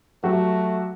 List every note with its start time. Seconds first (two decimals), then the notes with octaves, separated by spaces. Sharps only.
0.23 F#3 A3 F#4 G4